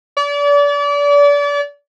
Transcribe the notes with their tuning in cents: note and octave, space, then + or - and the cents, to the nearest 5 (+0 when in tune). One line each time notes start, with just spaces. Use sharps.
D5 -35